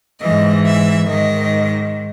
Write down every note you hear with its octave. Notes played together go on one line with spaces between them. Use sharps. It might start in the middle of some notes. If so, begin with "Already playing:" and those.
G#2 E3 D#5
E5
G#2 D#3 D#5